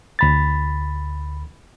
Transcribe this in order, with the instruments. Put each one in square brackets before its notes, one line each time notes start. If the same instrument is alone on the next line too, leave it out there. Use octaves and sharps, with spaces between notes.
[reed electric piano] D2 B5 A6